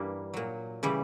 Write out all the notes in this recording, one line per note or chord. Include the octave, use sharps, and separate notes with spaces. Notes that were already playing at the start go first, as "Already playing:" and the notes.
Already playing: G2 E3 G3 A#3
A#2 F#3
C#3 E3 G3